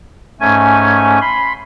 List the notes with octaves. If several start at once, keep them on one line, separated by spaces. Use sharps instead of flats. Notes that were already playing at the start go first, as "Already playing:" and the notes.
G#2 A3 C#4 G#5
B5 C6